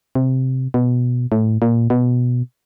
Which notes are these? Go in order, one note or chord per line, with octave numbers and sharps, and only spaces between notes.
C3
B2
A2
A#2
B2